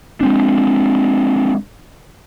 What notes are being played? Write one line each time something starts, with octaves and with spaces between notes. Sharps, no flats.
G#3 C4 D4